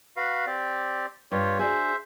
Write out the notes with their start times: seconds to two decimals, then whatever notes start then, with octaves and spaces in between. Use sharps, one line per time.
0.17 F#4 B4 F5
0.47 C4 G4 D5
1.32 G2 F4 G4 C#5
1.59 D4 F#4 G#4 C5 E5